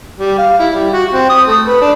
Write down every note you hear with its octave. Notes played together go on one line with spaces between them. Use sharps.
G3
F5
E4
G3
F#4
C4
D#6
A3
B4
D4